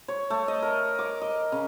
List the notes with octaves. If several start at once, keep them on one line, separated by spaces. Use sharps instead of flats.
C#5
A3
D#5
A#4
D6
D#5
C#3